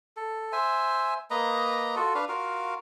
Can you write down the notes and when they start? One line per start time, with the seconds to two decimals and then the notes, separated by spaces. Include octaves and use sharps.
0.17 A4
0.52 C5 E5 G#5
1.31 A#3 B4 D#5 A#5
1.96 F4 F#4 A4
2.15 D4 B4 F5
2.29 F4 F#4 A#4 F5